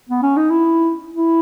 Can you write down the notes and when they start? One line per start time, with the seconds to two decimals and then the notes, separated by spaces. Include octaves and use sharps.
0.09 B3
0.22 C#4
0.36 D#4
0.50 E4
1.14 E4